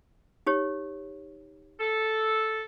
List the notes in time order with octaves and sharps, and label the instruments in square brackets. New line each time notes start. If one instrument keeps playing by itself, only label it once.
[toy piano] D#4 G4 C#5
[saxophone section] A4